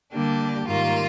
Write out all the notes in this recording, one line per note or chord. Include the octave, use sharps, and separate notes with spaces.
D3 G3 A#3 D4 G4
G#2 D#3 G3 A#3 F4